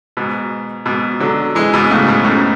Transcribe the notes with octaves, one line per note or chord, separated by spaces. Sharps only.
G#2 B2
G#2 B2
D3 F#3
E3 G#3
G#2 B2
A2 C#3
G#2 B2
F#2 A2